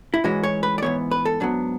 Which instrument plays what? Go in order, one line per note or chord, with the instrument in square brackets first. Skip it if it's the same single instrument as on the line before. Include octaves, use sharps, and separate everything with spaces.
[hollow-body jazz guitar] E4
G#2 E3 G#3 C#4 F#4
C#5
B4
D5
G#2 E3 B3 C#5
B4
A4
G#2 F#3 B3 D4